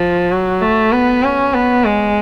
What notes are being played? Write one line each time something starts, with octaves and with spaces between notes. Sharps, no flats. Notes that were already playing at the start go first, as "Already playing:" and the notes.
Already playing: F3
F#3
A3
B3
C#4
B3
G#3